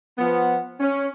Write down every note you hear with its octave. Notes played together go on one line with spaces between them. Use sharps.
F3 B3
C#4